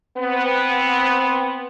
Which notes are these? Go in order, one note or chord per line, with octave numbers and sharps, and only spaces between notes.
B3 C4